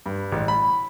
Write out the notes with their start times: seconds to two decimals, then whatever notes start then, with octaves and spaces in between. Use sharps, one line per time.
0.06 G2
0.32 A1
0.48 B5